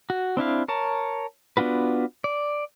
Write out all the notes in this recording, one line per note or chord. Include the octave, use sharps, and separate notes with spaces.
F#4
C4 D4 E4 F5
A#4 C#5 A5
B3 D4 F4 F#4 B4
D5